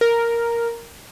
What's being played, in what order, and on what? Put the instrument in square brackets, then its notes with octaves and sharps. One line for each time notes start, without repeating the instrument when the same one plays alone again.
[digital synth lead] A#4